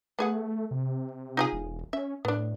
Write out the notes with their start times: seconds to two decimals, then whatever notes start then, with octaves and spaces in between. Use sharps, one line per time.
0.19 A3 B3 G#4 F#5
0.71 C3
1.37 D#4 F4 G#4
1.53 E1
1.93 C#4 E5
2.25 A2 B3 D4